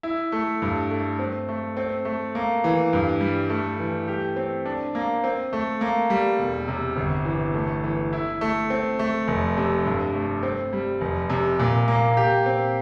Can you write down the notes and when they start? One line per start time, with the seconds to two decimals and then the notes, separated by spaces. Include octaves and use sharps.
0.03 E4
0.32 A3
0.62 G2
0.91 A3
1.19 C4
1.48 A3
1.77 C4
2.05 A3
2.35 A#3
2.64 E3
2.93 G2
3.21 G3
3.49 A3
3.79 E3
4.08 G4
4.36 C4
4.65 D4
4.95 A#3
5.24 C4
5.53 A3
5.81 A#3
6.10 G3
6.39 E1
6.68 C3
6.96 G1
7.25 E3
7.54 A3
7.84 E3
8.13 E4
8.41 A3
8.70 C4
8.99 A3
9.27 F1
9.57 C3
9.85 G2
10.15 A3
10.43 C4
10.73 G3
11.01 F1
11.30 C3
11.59 A#2
11.88 A#3
12.17 G4
12.46 C4